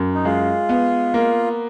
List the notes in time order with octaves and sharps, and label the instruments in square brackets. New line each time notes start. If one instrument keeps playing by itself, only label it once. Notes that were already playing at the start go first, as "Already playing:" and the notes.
Already playing: [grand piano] F#2
[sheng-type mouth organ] D#4
[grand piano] G#3 [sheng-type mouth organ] F4
[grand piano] B3
A#3